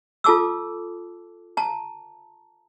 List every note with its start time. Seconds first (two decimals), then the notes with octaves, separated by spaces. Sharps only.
0.24 F4 A4 A5 D6 E6
1.57 A5 A#5